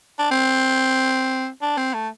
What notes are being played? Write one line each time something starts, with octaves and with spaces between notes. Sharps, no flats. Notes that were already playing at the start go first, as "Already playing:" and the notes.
D4
C4
D4
C4
A3